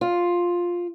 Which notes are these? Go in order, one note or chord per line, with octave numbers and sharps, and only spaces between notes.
F4